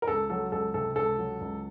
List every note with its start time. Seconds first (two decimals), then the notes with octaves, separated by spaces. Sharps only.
0.02 A#4
0.08 C#2 A4
0.30 F#3 A4
0.52 C#2 A4
0.74 C3 A4
0.96 C#2 A4
1.18 F#3
1.41 C#2